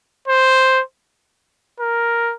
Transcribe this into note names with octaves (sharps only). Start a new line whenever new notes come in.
C5
A#4